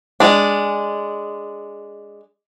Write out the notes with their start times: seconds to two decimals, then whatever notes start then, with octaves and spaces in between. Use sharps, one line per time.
0.20 G#3 D4